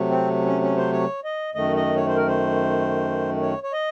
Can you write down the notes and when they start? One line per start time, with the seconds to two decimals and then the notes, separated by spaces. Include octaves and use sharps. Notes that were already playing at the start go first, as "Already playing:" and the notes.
Already playing: C3 F#3 A3
0.10 C4
0.45 C#4
0.62 C#4
0.77 C5
0.92 C#5
1.24 D#5
1.54 F#2 D#3 A3 D#5
1.76 D#5
1.96 C#5
2.07 C5
2.17 A#4
2.27 C5
3.42 C#5
3.63 C#5
3.73 D#5